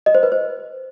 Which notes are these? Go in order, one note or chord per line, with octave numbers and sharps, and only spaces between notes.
D#5
C5
B4
C5